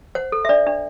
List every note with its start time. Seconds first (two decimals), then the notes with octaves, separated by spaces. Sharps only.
0.15 C5 F#5
0.32 A4
0.45 E5
0.49 D4 D5
0.66 D4